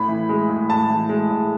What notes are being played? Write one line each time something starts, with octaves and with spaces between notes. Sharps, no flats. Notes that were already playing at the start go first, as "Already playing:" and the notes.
Already playing: A2 B5
E3
G#3
A2
A2 A5
E3
G#3
A2